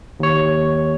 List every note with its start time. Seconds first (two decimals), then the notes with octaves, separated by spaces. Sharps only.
0.20 D#2 C#5